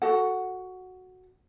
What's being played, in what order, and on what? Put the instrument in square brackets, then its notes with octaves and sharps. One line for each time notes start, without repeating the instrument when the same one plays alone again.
[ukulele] F#4 A4 F#5